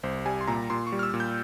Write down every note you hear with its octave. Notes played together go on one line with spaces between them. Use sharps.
C2 C5
G3 G#5
C6
A#2 A#5
A#2 C6
C#6
G3
F6
E6
A#2
G6